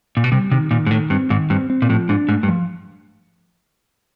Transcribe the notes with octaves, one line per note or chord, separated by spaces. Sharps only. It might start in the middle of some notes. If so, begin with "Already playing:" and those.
A#2
B2
C3 G3
C3 D#3
A#2 D#3
G#2
A2 D#3
G2 C4
G#2 D#3
G2 C4
C4
A#2
A2 F3
G#2 D4
G#2 A3
G2
F3